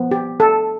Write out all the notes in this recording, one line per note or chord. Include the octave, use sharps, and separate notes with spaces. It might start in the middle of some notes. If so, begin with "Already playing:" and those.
Already playing: F3 B3
G4
A4